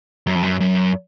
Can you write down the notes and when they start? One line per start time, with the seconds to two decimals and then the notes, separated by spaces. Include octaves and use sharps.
0.27 F#2
0.35 F2
0.43 F#2
0.61 F#2